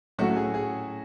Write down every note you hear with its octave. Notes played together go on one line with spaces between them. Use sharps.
A2 F#3 A3 C#4 F#4
G#4
G#4